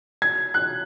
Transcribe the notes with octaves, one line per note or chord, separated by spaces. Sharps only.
G#6
F#6